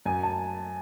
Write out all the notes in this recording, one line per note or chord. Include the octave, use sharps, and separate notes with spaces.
F#2 G#5
A5